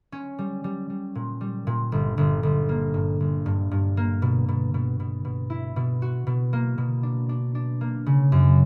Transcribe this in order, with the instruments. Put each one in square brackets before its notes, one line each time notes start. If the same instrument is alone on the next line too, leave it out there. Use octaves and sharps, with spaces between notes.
[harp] C#4
G3
G3
G3
A#2
G3
A#2
G1
G1
G1
A#3
G2
G1
G2
G2
A#3
B2
B2
B2
B2
B2
E4
B2
F#4
B2
A#3
B2
D4
D4
D4
A#3
C#3
F#2